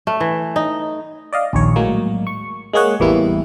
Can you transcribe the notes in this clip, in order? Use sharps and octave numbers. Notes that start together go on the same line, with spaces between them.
A3
E3
D#4
D5 D#5 F5
A#1 D#2 C#5
A2 F#3 G#3 A#3
C#6
G#3 A#3 G#4 C#5 F#5
A1 E2 E3 G3 A#3 E4